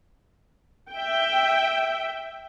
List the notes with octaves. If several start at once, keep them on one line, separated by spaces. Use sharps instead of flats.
E5 G5